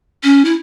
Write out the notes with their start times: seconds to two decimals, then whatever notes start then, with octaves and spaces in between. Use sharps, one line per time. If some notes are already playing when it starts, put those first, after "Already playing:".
0.24 C#4
0.45 E4